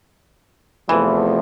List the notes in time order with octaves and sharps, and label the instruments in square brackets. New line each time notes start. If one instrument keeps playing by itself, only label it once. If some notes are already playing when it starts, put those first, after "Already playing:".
[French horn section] E2 C3 F3 A3 [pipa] E3